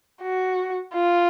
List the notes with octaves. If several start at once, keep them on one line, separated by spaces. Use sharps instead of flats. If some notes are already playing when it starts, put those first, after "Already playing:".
F#4
F4